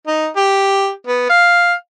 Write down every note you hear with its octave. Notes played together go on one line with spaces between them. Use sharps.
D#4
G4
B3
F5